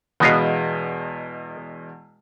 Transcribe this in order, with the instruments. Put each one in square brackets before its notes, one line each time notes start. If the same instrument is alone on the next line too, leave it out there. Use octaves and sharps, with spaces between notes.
[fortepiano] E2 B2 G#3 [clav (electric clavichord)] B3 D#5 F5